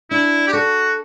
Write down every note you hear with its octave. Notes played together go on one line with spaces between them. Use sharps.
D4 E4
G4
F#4 A4